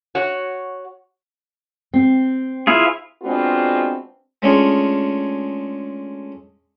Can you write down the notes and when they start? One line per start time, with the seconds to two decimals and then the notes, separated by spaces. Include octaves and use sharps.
0.15 F#4 C#5
1.94 C4
2.67 E4 F4 G#4
3.22 G#3 B3 C4 D4 F4 F#4
4.42 G#3 A3 C#4 D4 F4 G#4